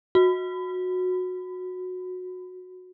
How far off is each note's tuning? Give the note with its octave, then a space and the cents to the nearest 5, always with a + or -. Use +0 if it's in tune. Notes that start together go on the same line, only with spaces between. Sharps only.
F#4 -15